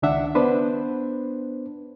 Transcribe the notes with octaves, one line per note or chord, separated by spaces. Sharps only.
C#2 D#3 D4 E5 F#5
B3 D4 B4 C5